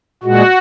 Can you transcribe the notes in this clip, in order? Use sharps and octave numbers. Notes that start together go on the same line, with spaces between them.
A#2 G#3 F#4